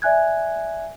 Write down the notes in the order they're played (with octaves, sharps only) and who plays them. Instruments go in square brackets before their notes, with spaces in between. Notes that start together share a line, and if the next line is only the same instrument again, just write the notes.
[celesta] D5 E5 G#5 F#6 G#6